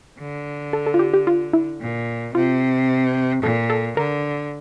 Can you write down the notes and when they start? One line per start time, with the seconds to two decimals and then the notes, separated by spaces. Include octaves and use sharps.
0.20 D3
0.73 A4
0.87 A4
0.94 F4
0.99 G4
1.14 G4
1.27 F4
1.53 E4
1.81 A#2
2.35 C3 F4
3.42 A#2 A4
3.70 A4
3.97 D3 A#4